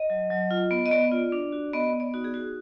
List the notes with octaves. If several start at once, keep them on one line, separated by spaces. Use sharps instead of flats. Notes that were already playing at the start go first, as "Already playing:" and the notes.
Already playing: D#5
F#3
F#3
F4
B3
D#5
B3 D5
F4
D4
F#4
B3 D#5
B3
D5
D#4 F#4
G#4
F#4